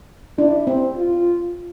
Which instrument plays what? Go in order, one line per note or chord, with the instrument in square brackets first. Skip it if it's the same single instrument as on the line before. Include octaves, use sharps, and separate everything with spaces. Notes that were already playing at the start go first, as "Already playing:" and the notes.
[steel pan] D4 [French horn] E4
[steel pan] C4
[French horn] F4